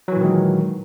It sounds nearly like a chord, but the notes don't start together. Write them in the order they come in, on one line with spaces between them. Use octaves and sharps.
F#3 E3 A#2 D#3 G#3